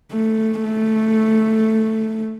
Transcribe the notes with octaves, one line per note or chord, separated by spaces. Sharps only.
A3
A3